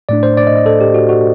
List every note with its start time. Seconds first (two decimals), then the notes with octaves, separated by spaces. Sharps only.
0.09 A2 A3 D4 D5
0.23 C5
0.37 D5
0.47 D#5
0.57 D#5
0.66 A4
0.81 G4
0.94 F#4
1.09 F#4